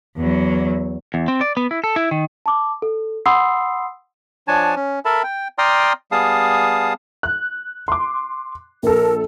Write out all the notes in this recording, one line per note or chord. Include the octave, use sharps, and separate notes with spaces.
E2 F#3
E2
C4
D5
B3
E4
A4
E4
D#3
A5 D6
A4
F#5 B5 C6 D#6 E6 C7
F3 D4 C#5 G#5 A5
C#4
A4 A#4 E5 A5 B5
G5
D5 G5 A#5 C6 D#6 F6
G3 B3 G#4 F5 A5 D#6
F#6
C6 D6
A#1 A4 A#4